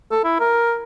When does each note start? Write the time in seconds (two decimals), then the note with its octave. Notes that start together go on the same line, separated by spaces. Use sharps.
0.11 A4
0.24 E4
0.40 A#4